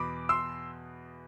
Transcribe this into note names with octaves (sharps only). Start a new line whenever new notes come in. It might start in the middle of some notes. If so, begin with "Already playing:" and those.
Already playing: E2 B2 B3 B5 D6
C6 E6